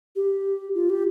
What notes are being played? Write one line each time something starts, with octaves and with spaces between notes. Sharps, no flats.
G4
F4
G4